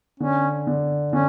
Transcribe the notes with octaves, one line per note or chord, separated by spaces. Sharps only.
D3 C#4
D3
D3 C#4